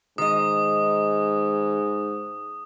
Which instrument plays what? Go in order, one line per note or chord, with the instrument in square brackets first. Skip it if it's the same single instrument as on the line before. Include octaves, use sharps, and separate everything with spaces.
[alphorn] G#2 [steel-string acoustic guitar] D#3 D#5 [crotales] D#6